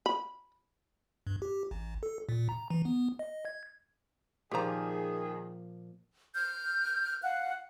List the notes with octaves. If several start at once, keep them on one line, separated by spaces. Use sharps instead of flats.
B5
G2
G4
A1
A4
A#2
A#5
E3
B3
D#5
G#6
A#2 D#3 F3 A#3 G4 G#4 A#5
F6 G6
F5 F#5 F#6